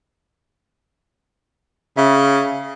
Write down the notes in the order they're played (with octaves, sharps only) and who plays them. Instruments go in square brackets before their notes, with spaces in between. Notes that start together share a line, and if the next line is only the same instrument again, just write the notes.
[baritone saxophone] C#3 [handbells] E5 F5